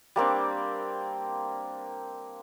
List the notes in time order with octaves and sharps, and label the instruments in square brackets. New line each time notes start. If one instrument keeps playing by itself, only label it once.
[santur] G3 A#3 C4 D4